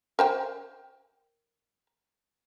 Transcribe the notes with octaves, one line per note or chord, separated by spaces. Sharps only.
A#4 C5 G5